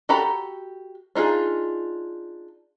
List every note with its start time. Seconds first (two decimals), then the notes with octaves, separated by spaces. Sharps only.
0.09 F#4 G4 A4 A#5 B5
1.15 D4 D#4 F4 G#4